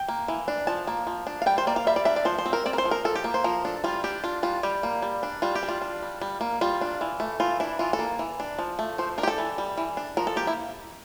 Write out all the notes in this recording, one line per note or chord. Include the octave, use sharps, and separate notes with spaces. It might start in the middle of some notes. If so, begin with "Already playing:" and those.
Already playing: G5
A#3
E3
D4
F3 A5
A#3
F3
D4
F5
G3 G5
C5
A#3 D5
F5
G3 E5
D5
D4 E5
D5
F3 C5
C5
C4
A#4
C4 D5
A#4
C5
F3
A#4
F3 A4
G4
A#3
C5
F3 A#4
D4 A4
G3 F4
D4 G4
D4 F4
G3 F4
G3 G4
A#3
G3
D4
G3 F4
G4
D4
F4
D4
G3
G3
A#3
G3 F4
D4
E3
A3
E3 F4
D4 E4
E3 F4
A4
A#3
E3
D4
F3
A3
F3 C5
D4 A#4
G4
A4
E3
G3
E3
D4
F3 A#4
A4
A#3 G4
E4